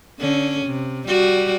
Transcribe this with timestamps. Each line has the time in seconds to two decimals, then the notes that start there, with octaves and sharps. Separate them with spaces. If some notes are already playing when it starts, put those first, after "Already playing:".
0.19 D3 C#4
0.66 C3
1.08 G3 F#4